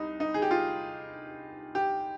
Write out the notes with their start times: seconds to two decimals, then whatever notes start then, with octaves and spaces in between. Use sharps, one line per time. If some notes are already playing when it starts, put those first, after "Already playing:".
Already playing: C2 D#4
0.20 D#4
0.34 G#4
0.42 G4
0.51 F4
1.75 G4